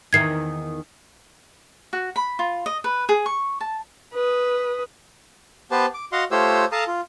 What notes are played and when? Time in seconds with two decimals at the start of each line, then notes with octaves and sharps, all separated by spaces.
0.13 E2 D#3 C4 G#6 C7
1.93 F#4
2.16 B5
2.39 F4
2.66 D#5
2.84 B4
3.09 G#4
3.26 C#6
3.60 A5
4.13 B4 D#6
5.71 B3 G4 B4 C5 A5
5.94 D6
6.12 F#4 D#5 F5 F#5 C6
6.31 A3 F4 G4 C5 C#5 E6
6.72 A4 F5 A5 A#5 D#6
6.87 F4